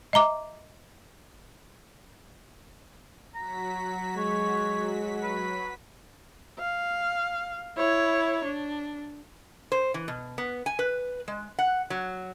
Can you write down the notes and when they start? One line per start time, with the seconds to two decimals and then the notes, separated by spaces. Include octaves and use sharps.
0.13 D#5 E5 A#5 D6
3.35 F#3 F#4 A#5 B6
4.17 G#3 C#5
5.23 B4
6.59 F5
7.77 E4 C#5
8.44 D4
9.72 C5
9.94 E3
10.08 B2
10.38 B3
10.66 G#5
10.79 B4
11.28 G#3
11.59 F#5
11.90 F#3